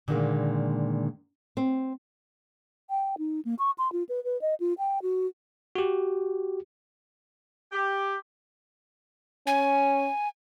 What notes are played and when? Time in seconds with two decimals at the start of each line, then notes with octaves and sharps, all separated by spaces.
0.08 A#2 D3 D#3 F#3 G#3 A#3
1.57 C4
2.90 G5
3.18 D#4
3.45 A#3
3.59 C#6
3.78 C6
3.92 F4
4.09 B4
4.24 B4
4.42 D#5
4.60 F4
4.79 G5
5.02 F#4
5.75 F#4 G4
7.72 G4
9.47 C#4 G#5